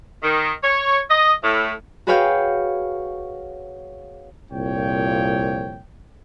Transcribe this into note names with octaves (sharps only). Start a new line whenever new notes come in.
D#3
C#5
D#5
A2
F#4 G#4 B4 C#5 F5 G5
C2 F2 A#2 F3 C#5 G5